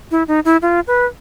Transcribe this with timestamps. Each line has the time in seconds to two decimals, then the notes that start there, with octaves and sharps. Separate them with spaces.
0.11 E4
0.28 D#4
0.45 E4
0.62 F4
0.87 B4